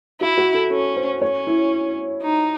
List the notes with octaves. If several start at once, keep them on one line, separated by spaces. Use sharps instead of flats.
E4 F#4
F#4
A4
C#4 A4
C5
C#4 C#5
E4
D#4